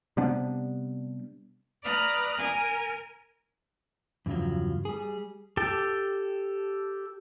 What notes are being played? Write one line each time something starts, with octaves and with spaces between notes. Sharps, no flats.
C3 G3 B3 D4
B4 D5 A#5 D#6 F6 F#6
A#4 G#5
E2 G2 C#3 F3 F#3
G3 G#4
G4 A4 G5 A5